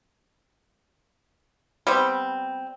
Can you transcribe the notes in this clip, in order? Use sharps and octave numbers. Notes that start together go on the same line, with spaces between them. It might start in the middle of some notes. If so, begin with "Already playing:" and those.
G3 B3 C4